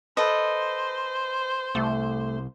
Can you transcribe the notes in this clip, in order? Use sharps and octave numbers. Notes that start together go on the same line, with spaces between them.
A4 B4 C5 D#5
C2 A3